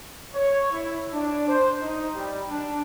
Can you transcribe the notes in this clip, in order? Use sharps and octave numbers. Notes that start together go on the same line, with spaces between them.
C#5
E4
D4
C5
D#4
G3
D4